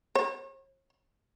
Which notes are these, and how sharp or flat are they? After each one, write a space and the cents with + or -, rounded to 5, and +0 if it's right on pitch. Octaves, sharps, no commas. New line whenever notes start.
C#5 -45